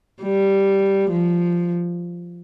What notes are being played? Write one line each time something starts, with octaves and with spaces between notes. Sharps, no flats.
G3
F3